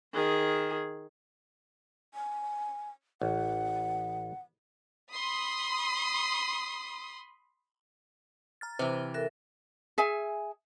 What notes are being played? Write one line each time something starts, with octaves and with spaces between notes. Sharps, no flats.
D#3 G#4
G#5
A1 F#5
B5 C6 D#6
A#5 F6 A6
C3 E3 B4 C5 F6
A4 A#4 E5 F#6
G#4 E5 G#5